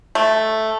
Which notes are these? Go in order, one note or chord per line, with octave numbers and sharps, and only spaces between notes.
A3